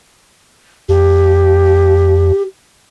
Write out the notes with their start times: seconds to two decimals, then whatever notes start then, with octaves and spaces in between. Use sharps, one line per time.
0.89 F2 G4